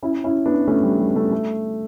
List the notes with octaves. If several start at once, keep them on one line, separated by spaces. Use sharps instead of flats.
C#4 E4
C#4 E4
B3 D4
A3 C#4
G3
G3
A3
A3